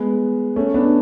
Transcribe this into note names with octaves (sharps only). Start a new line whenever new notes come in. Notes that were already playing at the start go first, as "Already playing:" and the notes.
Already playing: G#3 B3
A3 C#4
B3 D4